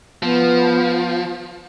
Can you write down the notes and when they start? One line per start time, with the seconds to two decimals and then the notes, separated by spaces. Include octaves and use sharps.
0.23 F3 B3